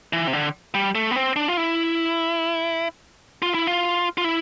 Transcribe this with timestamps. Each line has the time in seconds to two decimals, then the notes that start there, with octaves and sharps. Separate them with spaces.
0.13 E3
0.28 C3
0.33 D3
0.74 G3
0.95 A3
1.11 B3
1.16 C4
1.36 D4
1.48 F4
1.57 E4
3.42 F4
3.54 E4
3.67 F4
4.18 F4
4.24 E4